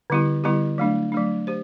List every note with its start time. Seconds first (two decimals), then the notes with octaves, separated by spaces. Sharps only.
0.10 D3 G3 B3 E4 G4
0.44 D3 G3 B3 E4 G4
0.78 F#3 A3 D4
1.12 F#3 A3 D4
1.47 G4 C5